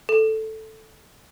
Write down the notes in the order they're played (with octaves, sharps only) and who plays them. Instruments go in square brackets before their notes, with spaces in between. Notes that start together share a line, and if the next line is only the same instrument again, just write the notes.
[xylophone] A4